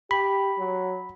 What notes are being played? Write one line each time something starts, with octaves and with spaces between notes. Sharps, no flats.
G4 B5
F#3